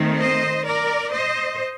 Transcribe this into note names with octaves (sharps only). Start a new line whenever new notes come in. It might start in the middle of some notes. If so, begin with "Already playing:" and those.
Already playing: D#3 A3 C4
C5 D#5
A#4 D5
C5 D#5